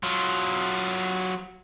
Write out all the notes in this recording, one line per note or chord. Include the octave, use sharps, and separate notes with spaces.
F#3 F4